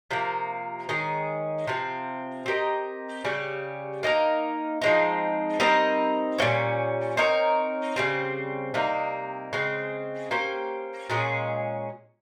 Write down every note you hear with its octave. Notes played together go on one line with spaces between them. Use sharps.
C3 F3 A#3
D#3 G#3 C#4 G#4
C3 F3 C4
C4 G4 A#4 D#5
C#3 G3 C#4 G4
A#3 D#4 G4 A#4
F3 G#3 C4 D#4
G3 C4 D#4 A#4
A#2 G3 A#3 C#4
C4 D#4 A#4 C#5
C#3 G3 C4
C3 G3 A#3 D#4
C#3 G#3 C4
A#3 C#4 G4 C5
A#2 G#3 C#4 G#4